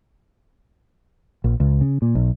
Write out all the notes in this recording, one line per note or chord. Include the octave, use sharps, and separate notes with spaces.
A#1
C#2
C#3
A#2
B1